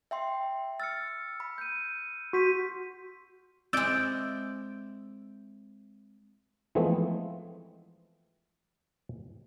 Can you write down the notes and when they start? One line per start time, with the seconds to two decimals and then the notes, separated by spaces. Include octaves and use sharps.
0.11 E5 G5 C6
0.80 E6 F6 A6 C#7
1.40 B5
1.58 G6 D#7
2.33 F#4 C6 B6 D#7
3.73 G#3 C4 E4 D5 D#5 E6 G6 D7
6.75 E3 F3 G#3 A3 B3 C4